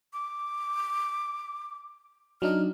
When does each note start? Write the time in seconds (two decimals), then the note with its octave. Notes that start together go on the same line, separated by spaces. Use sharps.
0.13 D6
2.42 F#3 D4 D#4 F6